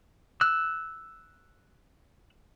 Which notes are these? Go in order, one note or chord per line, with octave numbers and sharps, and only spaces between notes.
E6 F#6